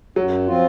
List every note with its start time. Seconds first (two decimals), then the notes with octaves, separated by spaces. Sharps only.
0.16 F#2 F#3
0.46 F3 C4 F4